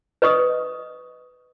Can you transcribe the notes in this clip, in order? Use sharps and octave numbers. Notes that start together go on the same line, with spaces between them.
B4 D#5 C#6 D#6